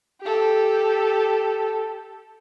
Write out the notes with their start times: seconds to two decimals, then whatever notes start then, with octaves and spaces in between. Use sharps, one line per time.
0.21 G4 A4